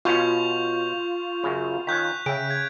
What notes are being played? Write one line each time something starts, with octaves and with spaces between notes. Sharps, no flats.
B2 C#4 F4 C#6 G6 F7
F#2 C#3
D#3 C#4 F#6 G6 B6
C#3 E5 G5 D7
G#6